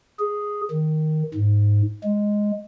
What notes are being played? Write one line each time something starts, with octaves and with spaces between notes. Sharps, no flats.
G#4
D#3
G#2
G#3